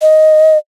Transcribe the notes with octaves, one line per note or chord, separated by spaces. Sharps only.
D#5